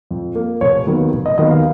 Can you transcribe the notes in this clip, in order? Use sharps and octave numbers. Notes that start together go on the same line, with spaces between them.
F2
F3 A#3
F1 C#5
D#2 D#3 F#3 B3
F1
D#5
D#2 D#3 F#3 B3 D#5
F5